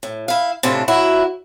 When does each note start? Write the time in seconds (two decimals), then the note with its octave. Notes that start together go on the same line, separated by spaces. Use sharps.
0.03 A2
0.28 E4 F5
0.63 A2 C3 E3 D4 F4
0.88 F#3 E4 F#4